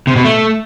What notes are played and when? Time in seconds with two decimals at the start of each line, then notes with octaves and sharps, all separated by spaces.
0.07 C3
0.16 B2
0.25 A3